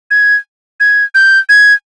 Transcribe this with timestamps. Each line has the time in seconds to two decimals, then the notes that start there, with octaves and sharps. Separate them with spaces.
0.11 G#6
0.80 G#6
1.15 G6
1.49 G#6